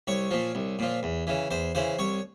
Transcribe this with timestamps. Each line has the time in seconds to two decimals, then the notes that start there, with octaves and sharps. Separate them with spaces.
0.07 C2 C#5
0.31 A#2 F3
0.55 C2
0.79 A#2 F3
1.03 E2
1.27 C#3 E3
1.50 E2 C5
1.75 C#3 E3 C5
1.99 C2 C#5